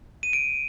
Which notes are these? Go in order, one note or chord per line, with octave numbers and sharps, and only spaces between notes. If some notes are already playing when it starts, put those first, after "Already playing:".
D#7
D7